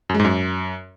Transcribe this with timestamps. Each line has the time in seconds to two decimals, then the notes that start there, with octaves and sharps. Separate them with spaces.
0.09 F#2
0.14 G#3
0.20 G#2
0.25 F#2